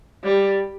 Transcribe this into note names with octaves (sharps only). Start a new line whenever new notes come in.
G3